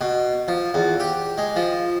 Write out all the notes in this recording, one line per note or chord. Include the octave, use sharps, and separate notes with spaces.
B2
F3
E2
G4
G#3
F3